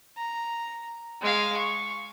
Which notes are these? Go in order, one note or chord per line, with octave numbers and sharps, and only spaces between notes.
A#5
G#3 F5
C#6